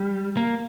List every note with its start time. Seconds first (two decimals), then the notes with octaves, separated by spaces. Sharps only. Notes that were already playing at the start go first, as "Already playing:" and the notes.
Already playing: G3
0.37 A#3